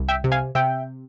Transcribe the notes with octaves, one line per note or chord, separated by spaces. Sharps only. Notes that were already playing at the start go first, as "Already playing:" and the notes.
Already playing: C2
E5 G5
C3
F5 G#5
C3 E5 G5